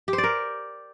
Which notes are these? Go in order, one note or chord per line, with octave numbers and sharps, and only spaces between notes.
G4
C5
D5
A#4